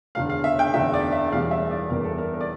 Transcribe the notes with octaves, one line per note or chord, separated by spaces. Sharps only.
E1 E2 D3 F5
F5
E5
G5
E1 E2 D3 E5
D5
E5
E1 E2 E3 G3 F5
E5
D5
E1 E2 E3 G3 A#4
A4
A#4
A#4
D5